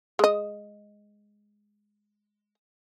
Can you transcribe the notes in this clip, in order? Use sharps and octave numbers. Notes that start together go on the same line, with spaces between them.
G#3 D#5